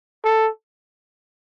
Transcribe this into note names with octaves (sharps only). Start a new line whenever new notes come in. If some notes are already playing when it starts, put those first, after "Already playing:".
A4